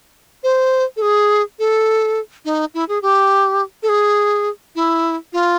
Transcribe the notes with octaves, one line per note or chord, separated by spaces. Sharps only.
C5
A4
G#4
A4
D#4
E4
G#4
G4
A4
G#4
E4
F4